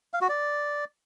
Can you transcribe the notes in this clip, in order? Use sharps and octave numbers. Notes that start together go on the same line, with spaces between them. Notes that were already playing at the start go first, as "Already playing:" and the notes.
F5
F#4
D5